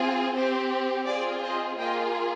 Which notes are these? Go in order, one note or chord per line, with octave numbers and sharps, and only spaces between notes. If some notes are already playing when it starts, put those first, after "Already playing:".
Already playing: C4 F4 G#4
C4 G4 C5
C4 F4 G#4 D5
C5 D#5
A#3 F4 G#4 D#5 G5